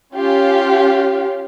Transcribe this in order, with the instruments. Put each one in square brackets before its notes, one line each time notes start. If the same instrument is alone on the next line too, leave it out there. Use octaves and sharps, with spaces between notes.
[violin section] C#4 F4 G4 F5